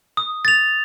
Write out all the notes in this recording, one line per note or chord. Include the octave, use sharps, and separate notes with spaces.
D#6
A6 F7